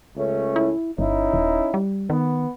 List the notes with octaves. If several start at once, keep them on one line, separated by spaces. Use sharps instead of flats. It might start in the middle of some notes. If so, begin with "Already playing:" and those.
C#2 A3 C#4
E4
G1 C#4 D#4 E4
D#1
G3
D#3 B3